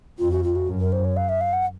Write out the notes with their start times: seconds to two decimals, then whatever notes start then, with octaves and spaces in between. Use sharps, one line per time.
0.18 F2 F4
0.31 F#4
0.43 F4
0.55 F#4
0.67 F#2
0.80 A#4
0.92 C5
1.04 C#5
1.16 F5
1.29 E5
1.41 F5
1.53 F#5